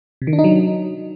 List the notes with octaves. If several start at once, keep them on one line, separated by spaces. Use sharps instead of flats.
C3
D#3
D4
D#4
F#3